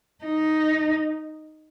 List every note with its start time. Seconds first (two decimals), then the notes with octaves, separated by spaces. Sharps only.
0.25 D#4